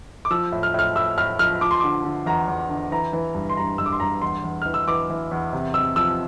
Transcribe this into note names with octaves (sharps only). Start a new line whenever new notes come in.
D6
F3 E6
A2
F6
A2 F6
A2 E6
A2 F6
F3 F6
F3 D6
C6
D3 D6
D3
E2 A#5
E2
D3
E3 A#5
E3
G2
C6
G2 A#5
G2 E6
D6
C6
G2 A#5
E2 C6
E2
E3 F6
E6
E3 D6
E3
E2
C3
C3 E6
F3 E6